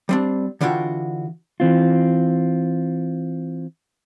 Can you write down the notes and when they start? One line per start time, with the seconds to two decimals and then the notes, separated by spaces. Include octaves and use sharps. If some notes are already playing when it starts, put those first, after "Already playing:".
0.09 G3 C4 D4
0.61 D3 E3 D4 F4 F#4 G5
1.60 E3 C4 F4